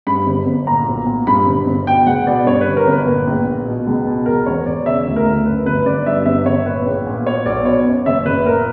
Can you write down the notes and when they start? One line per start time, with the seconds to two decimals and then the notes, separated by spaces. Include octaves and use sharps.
0.07 G2 B5
0.27 G1
0.46 G1
0.67 A#2 A#5
0.88 B1
1.07 A#2
1.27 G2 B5
1.46 G1
1.67 G1
1.86 B2 G5
2.06 C#2 F#5
2.27 B2 D5
2.46 G2 C#5
2.61 B4
2.67 G1
2.77 A#4
2.87 G1 B4
3.07 A#2
3.27 A#1
3.46 A#2
3.67 B2
3.87 C#2
4.07 B2
4.26 E2 A#4
4.46 E1 C#5
4.66 E1 D5
4.86 C#3 E5
5.07 D2
5.16 A#4
5.26 D2
5.46 F#2 B4
5.66 G1 B4
5.86 G1 D5
6.06 G2 E5
6.26 G1 E5
6.46 G1 C#5
6.66 A#2 B4
6.86 A#1
7.07 A#2
7.27 B2 C#5
7.46 B1 D5
7.65 B2 C#5
7.85 F#2
8.06 F#1 E5
8.26 F#1 B4
8.46 A#2 A#4